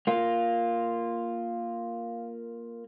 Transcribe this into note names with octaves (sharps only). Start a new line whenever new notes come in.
A#3 F4